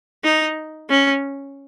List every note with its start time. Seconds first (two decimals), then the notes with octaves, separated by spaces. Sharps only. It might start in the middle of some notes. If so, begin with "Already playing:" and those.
0.24 D#4
0.89 C#4